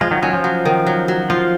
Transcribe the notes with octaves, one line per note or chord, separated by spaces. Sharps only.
F3 G#3 F4
D#3 F#3
D#3 F#3 C#4
F3
F#3
D#3
F#3
F#3
F3 F4